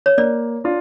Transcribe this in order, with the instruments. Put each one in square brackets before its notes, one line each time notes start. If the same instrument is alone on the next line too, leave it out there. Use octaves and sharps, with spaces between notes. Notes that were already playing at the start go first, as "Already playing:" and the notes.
[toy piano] C#5
[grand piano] A#3 [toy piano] D5
[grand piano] D4 F4